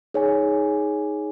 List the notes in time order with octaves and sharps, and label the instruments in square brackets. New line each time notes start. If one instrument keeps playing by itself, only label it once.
[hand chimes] D#4 G#4 C#5 G#5